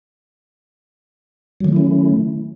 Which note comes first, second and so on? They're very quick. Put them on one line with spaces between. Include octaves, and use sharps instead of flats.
F#3 D#3 A3 E4 C#4